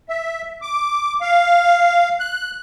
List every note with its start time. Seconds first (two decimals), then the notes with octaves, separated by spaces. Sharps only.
0.09 E5
0.62 D6
1.21 F5
2.19 F#6